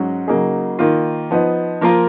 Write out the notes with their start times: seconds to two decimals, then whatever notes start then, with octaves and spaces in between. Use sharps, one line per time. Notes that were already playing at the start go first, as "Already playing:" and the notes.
Already playing: G#2 F#3 C#4 F#4
0.27 C#3 F#3 A#3 D#4 G#4
0.79 D#3 A#3 F4
1.31 F3 B3 D#4
1.81 F3 A#3 F4 A#4